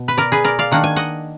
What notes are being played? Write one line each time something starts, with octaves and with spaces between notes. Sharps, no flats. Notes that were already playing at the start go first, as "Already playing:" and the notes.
Already playing: B2
B4
A#4 D5
G#4 B4
A#4 D5
D5 F5
D#3 A#3 D4 F#5
G#5
D#5 F#5